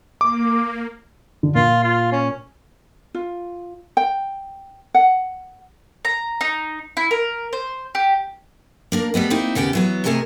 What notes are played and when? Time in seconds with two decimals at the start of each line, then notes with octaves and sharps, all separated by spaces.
0.21 A#3 D6
1.43 D3
1.55 A#2 F4
1.84 F4
2.12 C#4
3.15 F4
3.97 G5
4.94 F#5
6.05 A#5
6.41 D#4
6.97 E4
7.11 A#4
7.53 C5
7.95 G4
8.92 A#3 D4 A#4
9.14 G3 A3 B3 D#5
9.30 A#3 C4 D#4 E4
9.55 D#2 C#3 B3 G4 G5
9.73 E3 F#3 B3
10.04 C3 A3 G#4 A#4 D#5